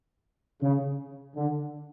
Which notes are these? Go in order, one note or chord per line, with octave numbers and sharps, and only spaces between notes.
C#3
D3